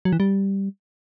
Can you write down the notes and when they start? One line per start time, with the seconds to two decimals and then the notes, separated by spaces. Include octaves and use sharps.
0.05 F#3
0.12 E3
0.20 G3